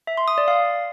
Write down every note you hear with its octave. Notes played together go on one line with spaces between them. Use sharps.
E5
C6
D#6
D5
F5